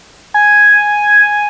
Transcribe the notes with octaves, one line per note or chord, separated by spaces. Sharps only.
G#5